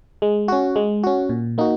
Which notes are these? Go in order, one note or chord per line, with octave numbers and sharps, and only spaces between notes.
G#3
C#4 F#4
G#3
C#4 F#4
A#2
A#3 D#4 F#4